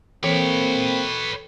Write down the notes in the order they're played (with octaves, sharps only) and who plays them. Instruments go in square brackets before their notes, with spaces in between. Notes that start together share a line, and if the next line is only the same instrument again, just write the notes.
[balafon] E3 [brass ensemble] A#3 C4 [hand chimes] A4 G5 D7 [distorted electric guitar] B4 C#5